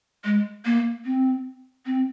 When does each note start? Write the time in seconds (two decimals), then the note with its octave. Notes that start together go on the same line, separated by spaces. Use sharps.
0.25 G#3
0.65 A#3
1.05 C4
1.86 C4